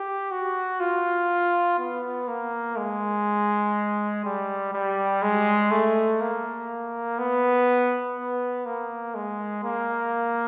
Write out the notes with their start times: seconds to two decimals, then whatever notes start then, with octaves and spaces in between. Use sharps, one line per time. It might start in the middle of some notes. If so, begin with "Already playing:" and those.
Already playing: G4
0.31 F#4
0.80 F4
1.79 B3
2.28 A#3
2.77 G#3
4.24 G3
4.73 G3
5.22 G#3
5.71 A3
6.20 A#3
7.19 B3
8.17 B3
8.66 A#3
9.15 G#3
9.64 A#3